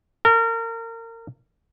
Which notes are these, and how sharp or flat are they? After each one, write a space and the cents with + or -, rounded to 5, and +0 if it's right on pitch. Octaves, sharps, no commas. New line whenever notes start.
A#4 -30